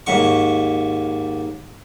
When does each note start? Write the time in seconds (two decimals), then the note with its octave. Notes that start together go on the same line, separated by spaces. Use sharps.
0.06 D#2 G#2 C#6